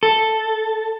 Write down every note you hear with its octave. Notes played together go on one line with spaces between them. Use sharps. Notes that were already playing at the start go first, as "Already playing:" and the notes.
A4